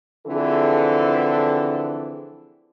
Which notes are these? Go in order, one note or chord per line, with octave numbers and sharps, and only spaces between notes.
D3 E3 F3 C4 G#4 A4